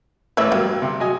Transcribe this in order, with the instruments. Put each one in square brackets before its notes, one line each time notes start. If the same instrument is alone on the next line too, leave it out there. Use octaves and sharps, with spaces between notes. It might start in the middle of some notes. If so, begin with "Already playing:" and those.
[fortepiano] A1 A3 B4 [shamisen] C#5 E5
[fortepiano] G2 F#3 [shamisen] A#3 G4
[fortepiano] C3
F#3 D#5 G#5